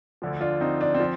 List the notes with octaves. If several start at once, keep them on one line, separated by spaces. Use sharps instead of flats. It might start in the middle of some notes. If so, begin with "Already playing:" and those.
D2 D3 F3
D4 F4
C4 D#4
D4
C4
F3